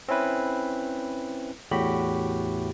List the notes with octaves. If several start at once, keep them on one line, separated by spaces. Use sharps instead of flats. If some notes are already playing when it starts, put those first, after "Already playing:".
C4 C#4 E4 B4
E2 A2 F#4 G4 B5